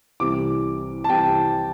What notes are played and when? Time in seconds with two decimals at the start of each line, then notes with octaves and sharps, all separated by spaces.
0.20 C2 C3 E3 D6
1.04 A5
1.08 C2 C3 E3 G5